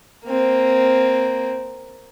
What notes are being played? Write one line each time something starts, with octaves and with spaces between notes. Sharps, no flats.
A#3 C4